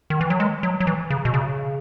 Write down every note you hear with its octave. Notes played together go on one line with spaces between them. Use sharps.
D#3
E3
F#3
G#3
F#3
F#3
E3
C#3
B2
C#3